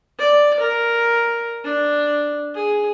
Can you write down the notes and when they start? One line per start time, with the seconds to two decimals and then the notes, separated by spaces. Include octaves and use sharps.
0.19 D5
0.59 A#4
1.64 D4
2.55 G#4